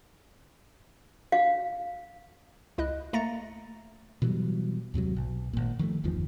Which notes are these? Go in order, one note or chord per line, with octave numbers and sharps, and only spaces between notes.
F5
C#2 E4 D#5 F#6
A3 A#3 A#5 A6 A#6 C#7
B2 E3 F#3 G3
D#2 G#2 C3 F#3
B1
G#1 A#2
D#3 F3 G3 A3
G1 E2 D#3 F3